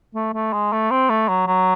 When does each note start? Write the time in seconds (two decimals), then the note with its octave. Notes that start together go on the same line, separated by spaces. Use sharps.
0.15 A3
0.34 A3
0.53 G#3
0.72 A3
0.91 C4
1.10 A3
1.29 F#3
1.47 F#3